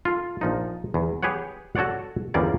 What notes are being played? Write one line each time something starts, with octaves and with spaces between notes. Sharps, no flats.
F4 A4
A#1 F3 D#4
E2
G4 G#4 B4 C#5 F#5
F#4 A4 C#5 D5 F#5
G1 E2 C#3 G3 A#3 D5